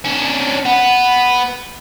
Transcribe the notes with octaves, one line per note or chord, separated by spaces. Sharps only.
C#4 D4
B3